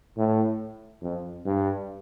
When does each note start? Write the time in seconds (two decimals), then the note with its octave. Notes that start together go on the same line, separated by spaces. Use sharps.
0.17 A2
1.02 F2
1.45 G2